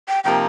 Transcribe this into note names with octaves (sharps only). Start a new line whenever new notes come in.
G5
C3 F3 A#3 D#4 G5